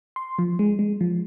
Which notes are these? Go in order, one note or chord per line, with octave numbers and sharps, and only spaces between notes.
C6
F3
G#3
G#3
F3